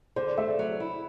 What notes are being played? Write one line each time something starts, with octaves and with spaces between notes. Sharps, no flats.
D3 C5
D5
A3 E5
D5
F#3
E4